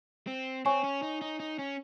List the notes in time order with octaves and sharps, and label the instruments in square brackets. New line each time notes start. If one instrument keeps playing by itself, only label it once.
[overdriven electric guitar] C4
[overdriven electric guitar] C4 [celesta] C#5 G#5 C#6
[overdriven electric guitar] C#4
D#4
D#4
D#4
C#4